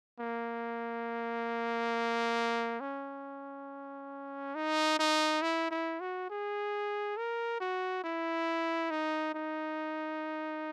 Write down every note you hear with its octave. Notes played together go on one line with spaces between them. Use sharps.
A#3
C#4
D#4
D#4
E4
E4
F#4
G#4
A#4
F#4
E4
D#4
D#4